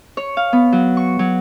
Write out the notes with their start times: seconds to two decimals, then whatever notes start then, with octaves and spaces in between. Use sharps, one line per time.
0.17 C#5
0.37 F5
0.53 B3
0.73 F#3
0.97 C#6
1.19 F#3